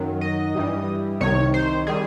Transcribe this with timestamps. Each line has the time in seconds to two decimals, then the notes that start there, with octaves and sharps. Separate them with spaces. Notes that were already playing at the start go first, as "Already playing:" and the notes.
Already playing: F#2 D#3 F#3
0.21 D#5
0.55 G2 E3 G3
1.20 C2 C3 D#3 C#5
1.54 C5
1.87 D#3 G3 G#4